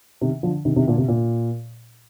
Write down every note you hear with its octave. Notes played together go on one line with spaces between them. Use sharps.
C3 D#3
D3 F3
C3 D#3
C3 D#3
A#2 D3
C3
A#2